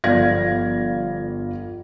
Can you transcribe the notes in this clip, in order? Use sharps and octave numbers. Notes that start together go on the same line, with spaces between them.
G1 F3 D5 F5 G#6 A#6